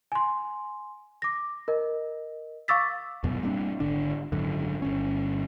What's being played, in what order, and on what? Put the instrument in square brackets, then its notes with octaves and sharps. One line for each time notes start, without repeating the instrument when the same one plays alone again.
[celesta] G#5 C6
D6 A#6
A#4 D#5
F5 C#6 D6 E6 A6 B6
[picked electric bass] D#1 F#2 B2
G3 A#3 C4 D4
G#1 D3 D4
G#1 F#2 D3
G1 C#4